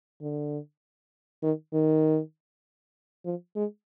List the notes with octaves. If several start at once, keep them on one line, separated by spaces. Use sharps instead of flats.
D3
D#3
D#3
F3
G#3